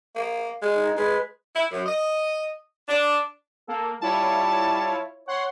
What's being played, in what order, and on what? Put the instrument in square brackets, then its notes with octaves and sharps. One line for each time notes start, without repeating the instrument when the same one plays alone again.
[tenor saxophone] A#3
G#3
[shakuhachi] D#4
[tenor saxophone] G#3 [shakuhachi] B4
[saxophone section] E4
F#2
D#5
D4
[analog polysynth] A#3 [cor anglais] A4
[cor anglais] G3 [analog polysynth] E4 F4 C#5 [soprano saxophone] A5
[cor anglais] C#5 [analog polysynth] F#5 C6